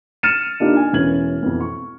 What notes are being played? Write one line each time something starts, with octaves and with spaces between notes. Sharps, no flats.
F6 A6 C#7 D#7 E7
D3 A#3 D4 D#4 F4 G4
G#5
E1 E3 C#4 G#6 F#7
F2 B2 E3
C#6